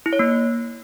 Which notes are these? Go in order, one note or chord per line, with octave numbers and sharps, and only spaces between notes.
E4
C#5
A#3